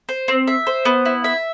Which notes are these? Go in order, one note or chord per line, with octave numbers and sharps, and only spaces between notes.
C5
C4
E5
C5
B3
E4
E5